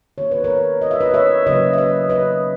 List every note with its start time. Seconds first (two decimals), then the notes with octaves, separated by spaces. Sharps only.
0.18 D#3 A#3 C#5
0.31 B4
0.44 A#4 C#5
0.82 D#5
0.91 E5
1.01 B4 D#5
1.14 C#5 E5
1.46 C#3 F#3 A#3 B4 D#5
1.73 E5
1.78 B4 D#5
2.09 B4 D#5